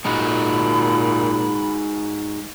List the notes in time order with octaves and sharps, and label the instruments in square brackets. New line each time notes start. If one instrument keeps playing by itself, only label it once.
[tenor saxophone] A#2 [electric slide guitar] G#3 D#4 F#4 [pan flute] B5